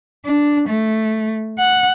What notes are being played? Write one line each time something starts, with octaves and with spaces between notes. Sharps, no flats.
D4
A3
F#5